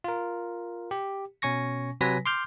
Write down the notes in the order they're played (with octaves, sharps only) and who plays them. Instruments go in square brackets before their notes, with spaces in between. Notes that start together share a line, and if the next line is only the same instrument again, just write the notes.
[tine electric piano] F4 A#4
G4
B2 C#4 G#5 C#6 A#6
C3 F#3 B4 G#5 A#6 B6
C6 D6 F6 G6